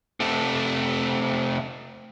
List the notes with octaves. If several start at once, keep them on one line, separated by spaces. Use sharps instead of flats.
C3 A3